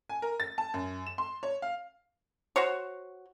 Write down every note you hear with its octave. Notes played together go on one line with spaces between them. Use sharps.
G#5
A#4
A6
A5
F#2
E7
C6
C#5
F5
F#4 C5 C#5